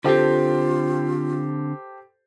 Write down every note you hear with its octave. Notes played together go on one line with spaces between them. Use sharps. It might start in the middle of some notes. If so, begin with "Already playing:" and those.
D3 C4 F4 G4 A4 C5